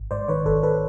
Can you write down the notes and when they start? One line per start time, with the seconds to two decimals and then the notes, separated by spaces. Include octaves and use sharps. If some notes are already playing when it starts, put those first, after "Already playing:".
Already playing: G#1
0.11 G#2 C5 D5
0.28 D#3 B4 C#5
0.46 G#1 A4 B4
0.63 A4 B4